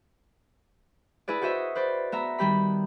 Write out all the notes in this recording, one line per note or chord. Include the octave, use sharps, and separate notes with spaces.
E4 G#4 B4 D5
F#4 G#4 C5 D#5 E5
B4 C5 D5
B3 E5 A#5
D#3 G3 G4 B5